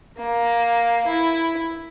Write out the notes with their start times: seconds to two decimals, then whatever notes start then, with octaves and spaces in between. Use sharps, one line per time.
0.17 A#3
1.06 E4